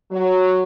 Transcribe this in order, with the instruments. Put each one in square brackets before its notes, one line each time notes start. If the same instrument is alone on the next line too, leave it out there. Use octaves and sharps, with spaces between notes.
[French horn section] F#3